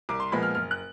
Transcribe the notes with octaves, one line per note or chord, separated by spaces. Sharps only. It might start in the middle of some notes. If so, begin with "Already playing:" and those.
C2 D6
C6
A#2 F3 G#3 B3 B5
F6
F#1 F6
F#6